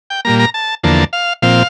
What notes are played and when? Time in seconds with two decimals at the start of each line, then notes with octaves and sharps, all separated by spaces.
0.10 G5
0.25 A#2 G3 A#3 A#5
0.40 A#5
0.54 A5
0.83 E2 D3 F3 A#3 A5
1.13 F5
1.42 A#2 F3 C4 F5